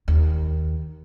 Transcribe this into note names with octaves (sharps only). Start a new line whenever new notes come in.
D#2